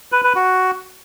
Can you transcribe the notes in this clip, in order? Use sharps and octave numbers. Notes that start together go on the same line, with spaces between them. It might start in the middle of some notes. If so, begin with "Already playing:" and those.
B4
B4
F#4